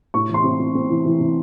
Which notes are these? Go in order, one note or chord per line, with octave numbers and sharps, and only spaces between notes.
A2 C#6
E3 C6
C4
C4
C4
E3
E3
C4